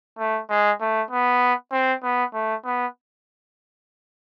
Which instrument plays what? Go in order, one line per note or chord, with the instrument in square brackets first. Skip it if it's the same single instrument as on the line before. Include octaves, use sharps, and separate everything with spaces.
[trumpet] A3
G#3
A3
B3
C4
B3
A3
B3